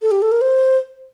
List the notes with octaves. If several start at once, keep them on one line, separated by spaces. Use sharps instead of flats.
A4
G4
A4
A#4
C5